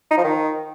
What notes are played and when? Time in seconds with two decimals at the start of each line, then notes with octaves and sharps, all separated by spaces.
0.11 D#4
0.17 F3
0.24 D#3